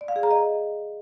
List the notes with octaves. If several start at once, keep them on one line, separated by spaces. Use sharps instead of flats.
D5
F5
G#4
A#5
D#5